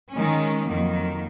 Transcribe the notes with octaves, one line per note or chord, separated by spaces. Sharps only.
D#3 G#3 C#4
F2 D#3 F#3 A#3